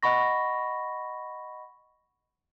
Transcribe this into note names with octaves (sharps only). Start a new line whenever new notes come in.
D#5 F#5 B5 C#6 A#6